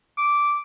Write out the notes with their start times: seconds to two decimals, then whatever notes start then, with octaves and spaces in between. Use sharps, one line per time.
0.18 D6